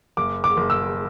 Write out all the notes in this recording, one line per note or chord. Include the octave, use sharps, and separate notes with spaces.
F#1 D6
D6
F#1
E6